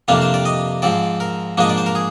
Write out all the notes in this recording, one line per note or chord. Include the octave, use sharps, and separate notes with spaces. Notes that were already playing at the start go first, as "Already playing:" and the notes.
F2 C3 G3 A#3 D4 F5
C5
D5
D#5
G#2 F3 C4 D5
A#4
G#2 F3 A#3 D4 D#5
D5
C5
A#4
G#4